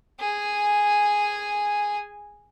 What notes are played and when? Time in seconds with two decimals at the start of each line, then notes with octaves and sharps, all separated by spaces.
0.20 G#4 G#5